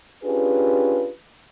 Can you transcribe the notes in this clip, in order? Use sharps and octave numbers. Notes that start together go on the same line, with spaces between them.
C#4 D4 F4 G4 G#4 B4